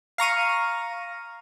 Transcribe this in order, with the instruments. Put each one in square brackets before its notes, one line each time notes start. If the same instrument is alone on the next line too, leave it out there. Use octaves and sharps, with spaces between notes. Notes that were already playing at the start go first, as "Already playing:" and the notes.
[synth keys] F5 A#5 C#6 D#7